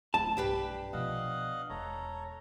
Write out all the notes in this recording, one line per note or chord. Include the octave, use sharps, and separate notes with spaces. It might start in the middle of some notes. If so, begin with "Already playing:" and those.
D1 A3 A5
B1 G2 D4 G4 B4
B2 F3 D#5 F5 F#5
E1 A4 C#5 A#5